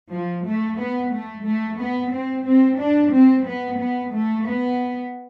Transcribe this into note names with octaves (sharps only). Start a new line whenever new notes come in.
F3
A3
B3
A3
A3
B3
C4
C4
D4
C4
B3
B3
A3
B3